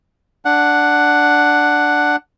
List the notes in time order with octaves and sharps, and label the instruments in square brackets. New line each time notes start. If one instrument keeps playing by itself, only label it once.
[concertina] D4 F#5